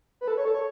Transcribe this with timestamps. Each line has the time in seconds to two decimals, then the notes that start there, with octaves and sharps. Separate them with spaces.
0.21 B4
0.28 A4
0.37 C#5
0.45 A4
0.54 C#5